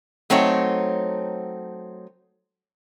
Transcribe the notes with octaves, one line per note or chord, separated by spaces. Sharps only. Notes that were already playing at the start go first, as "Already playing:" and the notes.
F#3 A3 C4 D#4 C#5